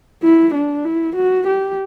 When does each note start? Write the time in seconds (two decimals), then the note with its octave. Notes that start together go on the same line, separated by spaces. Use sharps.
0.23 E4
0.54 D4
0.85 E4
1.16 F#4
1.47 G4